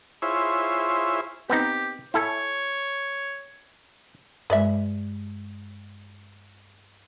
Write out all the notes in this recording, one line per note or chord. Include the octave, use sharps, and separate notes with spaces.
E4 F4 G#4 C5 C#5 E5
B3 C4 D#4 G4
E4 A4 C#5 G#5
G2 G#3 B4 D5 E5